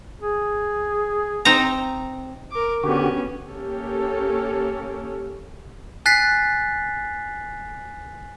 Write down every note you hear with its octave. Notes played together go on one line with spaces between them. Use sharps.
G#4
C4 D#4 A#5
A#4 D6
D3 B3 C#4 F#4 G4
A#3 C#4 G4 A4
G#5 F#6 A6 B6 C7